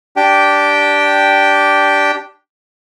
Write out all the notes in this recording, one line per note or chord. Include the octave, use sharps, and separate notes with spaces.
D4 G4 G5